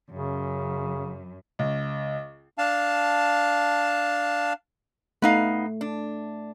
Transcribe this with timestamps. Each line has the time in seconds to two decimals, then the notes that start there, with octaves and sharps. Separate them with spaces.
0.10 F#2 C#3
1.59 C#2
2.58 D4 F5 A5
5.22 A3 B3 D#4 F5
5.81 D4